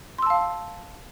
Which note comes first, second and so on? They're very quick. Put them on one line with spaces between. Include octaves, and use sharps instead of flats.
C6 E6 A5 F5